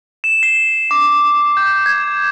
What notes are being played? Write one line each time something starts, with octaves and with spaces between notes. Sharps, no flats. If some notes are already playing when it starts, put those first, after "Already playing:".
E7
C7
D6
G6
G#6